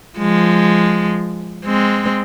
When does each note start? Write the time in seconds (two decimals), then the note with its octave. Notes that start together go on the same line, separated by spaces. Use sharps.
0.19 F3 G#3
1.65 G#3 C4